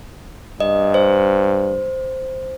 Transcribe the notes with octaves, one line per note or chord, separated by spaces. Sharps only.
G2 D#5
C5